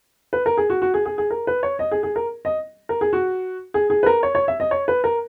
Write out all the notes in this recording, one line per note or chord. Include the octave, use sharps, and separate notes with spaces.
B4
A#4
G#4
F#4
F#4
G#4
G#4
G#4
A#4
B4
C#5
D#5
G#4
G#4
A#4
D#5
A#4
G#4
F#4
G#4
G#4
B4
A#4
C#5
C#5
E5
D#5
C#5
B4
A#4